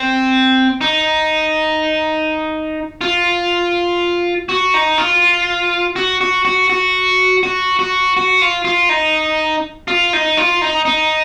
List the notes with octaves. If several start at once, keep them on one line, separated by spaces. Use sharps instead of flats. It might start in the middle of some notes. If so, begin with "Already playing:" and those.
Already playing: C4
D#4
F4
F#4
D#4
F4
F#4
F#4
F#4
F#4
F#4
F#4
F#4
F4
F4
D#4
F4
D#4
F4
D#4
D#4